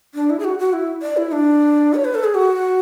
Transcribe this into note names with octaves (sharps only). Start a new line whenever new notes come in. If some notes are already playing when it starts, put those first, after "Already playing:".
D4
E4
G#4
F#4
F#4
E4
D5
E4
D4
C#5
B4
A4
G#4
F#4